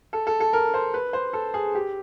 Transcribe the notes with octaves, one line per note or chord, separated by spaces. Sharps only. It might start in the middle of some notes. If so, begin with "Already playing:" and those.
A4
A4
A4
A#4
C5
B4
C5
A4
G#4
G4